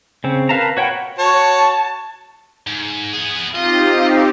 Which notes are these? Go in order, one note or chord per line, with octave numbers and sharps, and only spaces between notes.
C#3 C4
A#4 B4 F5 A5 A#5
F#4 C#5 F#5 G5 B5
F#4 C#5 A5
G#2
B3 G#4
C4 D#4 F4 G4 D#5